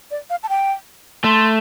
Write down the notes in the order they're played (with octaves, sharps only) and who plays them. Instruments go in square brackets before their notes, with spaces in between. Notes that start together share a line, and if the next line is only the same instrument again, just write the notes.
[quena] D5
F5
A5
G5
[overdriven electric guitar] A3 [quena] C6